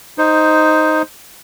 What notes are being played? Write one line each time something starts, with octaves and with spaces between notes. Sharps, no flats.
D#4 C5